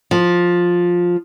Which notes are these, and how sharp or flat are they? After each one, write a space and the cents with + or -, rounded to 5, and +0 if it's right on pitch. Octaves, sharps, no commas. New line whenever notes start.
F3 +10